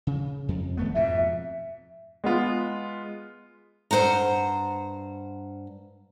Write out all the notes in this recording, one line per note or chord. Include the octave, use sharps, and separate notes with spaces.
C#3
F2
D1 A3 B3
F2 G#2 B2 E5
G#3 B3 F4
G2 F3 C5 F#5 A#5